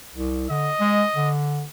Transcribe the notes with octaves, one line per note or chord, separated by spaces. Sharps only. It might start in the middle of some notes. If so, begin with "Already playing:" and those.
C2
D3 D#5
G#3
D3